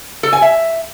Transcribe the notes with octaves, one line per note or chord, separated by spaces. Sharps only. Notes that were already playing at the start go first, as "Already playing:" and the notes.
A4
G#5
E5